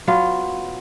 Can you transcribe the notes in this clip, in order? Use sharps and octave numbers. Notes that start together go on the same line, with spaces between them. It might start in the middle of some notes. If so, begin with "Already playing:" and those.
F#3 B3 F4